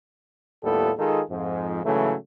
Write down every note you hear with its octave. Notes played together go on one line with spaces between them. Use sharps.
D#2 A2 G3 B3 F4 A4
D#3 G#3 D#4 F4 G#4 A4
F2 G#2 F3
G#2 C#3 E3 F#3 A3